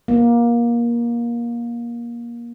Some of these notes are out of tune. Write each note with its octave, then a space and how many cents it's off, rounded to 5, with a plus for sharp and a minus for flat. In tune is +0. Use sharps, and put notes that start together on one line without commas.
A#3 +20